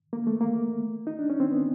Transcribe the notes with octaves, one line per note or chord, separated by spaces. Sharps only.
A#3
A3
A#3
D#4
D4
C#4
C4
B3